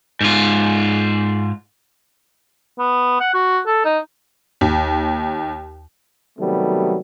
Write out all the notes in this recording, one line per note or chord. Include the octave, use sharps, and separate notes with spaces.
G#2 F4
B3
F#5
F#4
A4
D#4
D#2
C3 D#3 F#3 G3 A3 B3